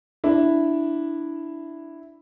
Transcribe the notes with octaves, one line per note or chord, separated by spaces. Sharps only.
D4 E4